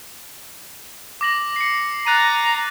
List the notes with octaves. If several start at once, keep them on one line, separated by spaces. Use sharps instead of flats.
D6 A#6 F#7
C7 C#7
A#5 F#6 A6 D#7